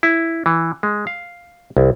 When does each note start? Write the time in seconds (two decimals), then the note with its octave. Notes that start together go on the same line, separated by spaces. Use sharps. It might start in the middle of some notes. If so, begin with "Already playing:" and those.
0.03 E4
0.46 E3
0.83 G#3
1.07 F5
1.77 C2